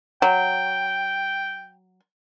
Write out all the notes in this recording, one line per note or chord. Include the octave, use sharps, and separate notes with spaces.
F#3 G5